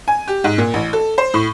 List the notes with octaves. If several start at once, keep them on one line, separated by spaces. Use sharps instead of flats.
G#5
G4
G#2
A#2
A1
A4
C5
A2